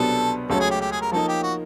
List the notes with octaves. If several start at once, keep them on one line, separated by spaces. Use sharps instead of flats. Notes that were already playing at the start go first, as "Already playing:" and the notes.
Already playing: C2 B2 F#3 B3 D4 A4
C#2 C#3 F#3 A3 C#4 A4
G#4
G4
G4
G#4
A#4
F3 A#3 D#4 A4
G4
F#4